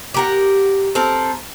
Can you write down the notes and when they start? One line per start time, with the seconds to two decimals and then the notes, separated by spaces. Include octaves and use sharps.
0.14 G4 A#4 F#5
0.95 C4 A4 A#4